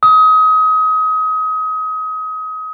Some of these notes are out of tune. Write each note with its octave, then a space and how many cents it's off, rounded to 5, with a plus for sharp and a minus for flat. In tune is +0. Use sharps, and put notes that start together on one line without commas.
D#6 +30